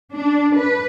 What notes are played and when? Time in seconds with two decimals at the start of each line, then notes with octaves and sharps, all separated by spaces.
0.14 D4
0.58 B4